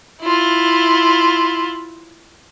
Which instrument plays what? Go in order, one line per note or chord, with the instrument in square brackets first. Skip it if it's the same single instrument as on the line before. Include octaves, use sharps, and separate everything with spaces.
[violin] E4 F4